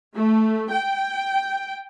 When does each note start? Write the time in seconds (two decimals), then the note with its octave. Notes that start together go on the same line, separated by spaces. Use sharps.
0.15 A3
0.71 G5